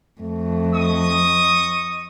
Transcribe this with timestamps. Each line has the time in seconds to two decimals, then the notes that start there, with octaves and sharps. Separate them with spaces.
0.21 F2 A3
0.74 D#5 C#6 D#6